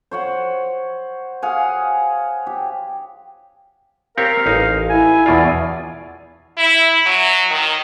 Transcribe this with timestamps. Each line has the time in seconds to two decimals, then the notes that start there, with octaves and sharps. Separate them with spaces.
0.11 C5 C#5 F#5
1.42 G#4 F5 F#5 G#5
2.47 G4
4.18 C4 G4 A#4 C#5 F5
4.46 A1 D#4
4.89 E4 G#5
5.26 E2 B2 F4 D5
6.58 E4
7.06 F#3
7.51 D#3